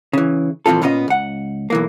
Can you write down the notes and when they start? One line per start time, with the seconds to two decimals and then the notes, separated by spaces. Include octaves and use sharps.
0.13 C#3 E3
0.66 A#2 E3 F3 C4 F4 A4
0.82 A#2 B3 C#4 E4 F4 D#5
1.08 C#2 F#5
1.70 B1 E3 A#3